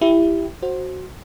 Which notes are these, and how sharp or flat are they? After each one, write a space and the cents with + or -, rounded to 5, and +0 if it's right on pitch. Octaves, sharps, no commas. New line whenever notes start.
E4 +10 G4 +0
F#4 +0 C5 +15